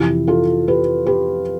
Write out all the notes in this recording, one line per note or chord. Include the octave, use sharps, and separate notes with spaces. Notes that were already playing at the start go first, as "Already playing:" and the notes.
Already playing: F2 C3 E3 E4 G4
F4 A4
G4 B4
G4 B4